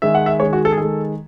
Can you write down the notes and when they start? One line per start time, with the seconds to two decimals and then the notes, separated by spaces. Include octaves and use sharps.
0.02 D#3 G#3 E5
0.15 F#5
0.26 E5
0.40 D#3 G#3 C#5
0.53 F#4
0.65 A4
0.72 G#4
0.77 D#3 G#3 A4